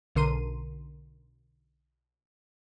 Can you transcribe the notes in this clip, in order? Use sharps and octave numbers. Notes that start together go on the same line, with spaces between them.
B1 D3 A#4 C6 D#7